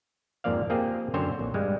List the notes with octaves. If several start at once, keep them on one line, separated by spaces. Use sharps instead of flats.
F2 G#2 F3 A#3 D5 F5
A#3 C4 F4 G4 G#4
F#2 D3 C4 C5 C#5
A#1
G2 G3 G#3